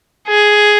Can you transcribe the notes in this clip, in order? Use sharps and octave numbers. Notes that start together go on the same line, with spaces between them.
G#4